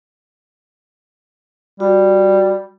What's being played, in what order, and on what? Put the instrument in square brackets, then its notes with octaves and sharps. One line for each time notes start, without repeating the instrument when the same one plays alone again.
[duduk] G3 [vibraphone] F#4